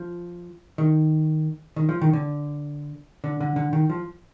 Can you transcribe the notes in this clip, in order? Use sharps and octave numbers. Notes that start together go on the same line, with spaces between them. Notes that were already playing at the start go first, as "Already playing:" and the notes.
Already playing: F3
D#3
D#3
F3
D#3
D3
D3
D3
D3
D#3
F3